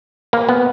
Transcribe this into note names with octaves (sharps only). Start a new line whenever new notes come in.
A#3
B3